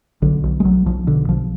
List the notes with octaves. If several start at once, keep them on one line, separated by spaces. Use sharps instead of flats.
B1 D3
B1
G#3
B1 F#3
B1 F3
B2 D3
B1 F3